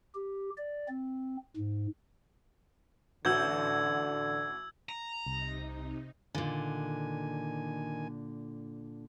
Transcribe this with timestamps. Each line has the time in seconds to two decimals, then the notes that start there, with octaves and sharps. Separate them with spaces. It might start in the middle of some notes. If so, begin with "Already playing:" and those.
0.15 G4
0.57 D5
0.88 C4
1.56 G#2
3.25 A1 D3 F#4 E6 G6 G#6
4.89 A#5
5.26 C2 C3 D#4
6.35 A#2 D3 D#3 G#5